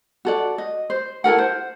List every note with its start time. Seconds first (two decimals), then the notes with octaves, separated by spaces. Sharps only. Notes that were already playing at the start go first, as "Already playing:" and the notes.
0.25 F#4 A4 D5
0.58 D#5
0.90 C5
1.24 E4 A4 A#4 F#5
1.38 C5